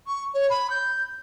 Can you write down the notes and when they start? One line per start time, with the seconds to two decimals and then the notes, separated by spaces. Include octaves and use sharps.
0.07 C#6
0.34 C#5
0.50 B5
0.70 G6